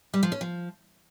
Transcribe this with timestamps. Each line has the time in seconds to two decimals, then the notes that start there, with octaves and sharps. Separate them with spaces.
0.14 G3
0.23 F3
0.32 C#4
0.41 F3